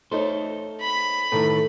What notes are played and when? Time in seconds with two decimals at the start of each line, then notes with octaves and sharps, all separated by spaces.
0.12 A3 D#4 A4 C5 C#5
0.81 B5
1.32 A2 D#3 A4 B4 A#5